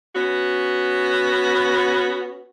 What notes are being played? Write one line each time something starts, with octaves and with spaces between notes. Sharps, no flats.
B3 C#4 F#4